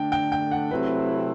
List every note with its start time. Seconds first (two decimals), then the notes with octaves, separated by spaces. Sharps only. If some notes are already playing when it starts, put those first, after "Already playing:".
Already playing: D3 A3 D4 G5
0.12 G5
0.32 G5
0.51 F#5
0.71 C3 F#3 A3 C4 E4 B4